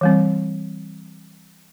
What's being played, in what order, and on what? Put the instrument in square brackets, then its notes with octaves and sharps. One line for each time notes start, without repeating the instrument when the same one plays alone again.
[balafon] E3 G3 C4